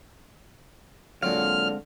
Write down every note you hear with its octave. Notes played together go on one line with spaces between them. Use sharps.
A#2 D3 F#3 G#3 C4 F5 F6